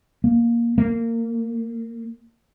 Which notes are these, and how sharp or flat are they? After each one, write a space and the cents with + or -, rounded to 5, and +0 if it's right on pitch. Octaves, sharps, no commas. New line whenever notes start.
A#3 +10
A#3 -25